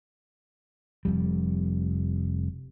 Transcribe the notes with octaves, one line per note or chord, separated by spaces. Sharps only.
F1 F2 G3